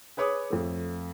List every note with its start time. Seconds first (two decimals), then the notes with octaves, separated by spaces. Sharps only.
0.17 G#4 B4 C#5 D6 D#6
0.50 F2 A3